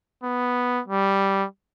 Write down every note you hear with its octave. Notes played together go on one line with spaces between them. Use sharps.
B3
G3